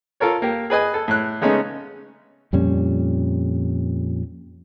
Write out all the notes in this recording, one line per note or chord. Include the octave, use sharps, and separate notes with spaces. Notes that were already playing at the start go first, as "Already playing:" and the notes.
F4 A4 A#4 C#5
A#3 G4
G#4 B4 D#5 G#5
A4
A2 F#6
C#3 G#3 A3 B3 C#4 D#4
F2 A#2 G3 C#4